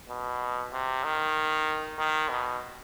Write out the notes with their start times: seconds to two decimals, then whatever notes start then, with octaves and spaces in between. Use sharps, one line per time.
0.09 B2
0.73 C3
1.04 D#3
1.99 D#3
2.29 B2